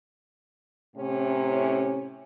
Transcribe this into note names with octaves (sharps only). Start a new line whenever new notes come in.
A2 C3 C#4